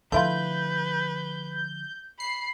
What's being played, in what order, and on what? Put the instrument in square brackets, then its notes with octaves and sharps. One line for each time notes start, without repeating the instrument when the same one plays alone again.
[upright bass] D3 F3 [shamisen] A3 E4 F4 [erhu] B4 [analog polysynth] G6
[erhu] B5 [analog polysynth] C7